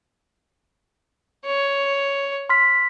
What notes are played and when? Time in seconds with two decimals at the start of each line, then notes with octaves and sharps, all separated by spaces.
1.46 C#5
2.49 C6 F6 B6